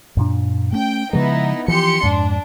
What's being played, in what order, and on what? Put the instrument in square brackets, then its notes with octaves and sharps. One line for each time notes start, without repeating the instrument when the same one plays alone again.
[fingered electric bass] F#2 A#2 D4
[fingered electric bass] A3 C#4 [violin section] G5
[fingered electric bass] C#3 F3 G#3 [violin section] B3 D#4 E4
[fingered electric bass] E3 F3 [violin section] G4 C6 C#7
[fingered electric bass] F2 G#2 [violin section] D4